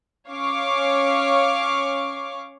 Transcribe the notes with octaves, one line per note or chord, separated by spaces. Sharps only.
C#4 C#5 F5 C#6 D6